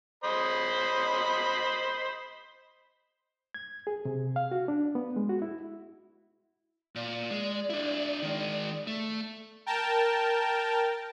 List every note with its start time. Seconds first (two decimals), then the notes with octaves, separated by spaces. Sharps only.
0.24 C5 D#5 B5
3.54 G#6
3.87 G#4
4.05 C3
4.36 F5
4.51 F#4
4.68 D4
4.95 B3
5.16 G#3
5.29 F#4
5.42 E4
6.95 A#2 D5
7.31 G#3
7.70 D4 E4
8.22 D#3 G#3
8.87 A3
9.66 A#4 G5 A5